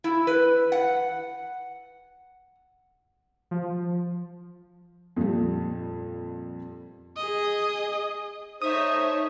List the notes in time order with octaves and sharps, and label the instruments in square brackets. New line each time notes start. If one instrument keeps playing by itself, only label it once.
[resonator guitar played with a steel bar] E4
B4
F#5
[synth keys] F3
[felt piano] F2 A#2 G3
[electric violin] G#4 D#5
[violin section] A3 C#5 E5 [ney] D#4 [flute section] C5 [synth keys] D#6